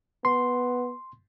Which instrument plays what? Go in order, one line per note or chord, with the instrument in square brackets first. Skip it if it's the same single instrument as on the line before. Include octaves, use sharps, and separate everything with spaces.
[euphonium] B3 [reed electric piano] C6